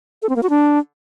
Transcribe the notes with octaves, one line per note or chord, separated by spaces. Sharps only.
A4
C4
A#3
F#4
D4